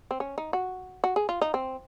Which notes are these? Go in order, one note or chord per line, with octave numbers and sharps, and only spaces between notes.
C4
C#4
D#4
F#4
F#4
G#4
F4
D#4
C4